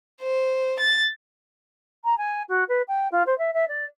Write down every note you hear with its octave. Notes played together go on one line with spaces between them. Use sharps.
C5
A6
A#5
G#5
F#4
B4
G5
F4
C5
E5
E5
D5